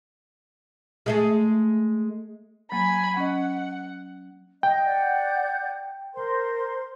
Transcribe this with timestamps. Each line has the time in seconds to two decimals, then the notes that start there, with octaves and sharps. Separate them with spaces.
1.06 G#3 A3 G#4
2.72 F#3 A#3 G#5 B5
3.17 C#4 D#5 F#5
4.63 D#5 G5
4.85 D5 F#5 G6
6.14 A#4 C5 C6